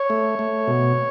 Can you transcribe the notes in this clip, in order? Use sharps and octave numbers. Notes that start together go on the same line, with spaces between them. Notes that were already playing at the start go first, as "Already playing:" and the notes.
Already playing: C#5
A3
A3
B2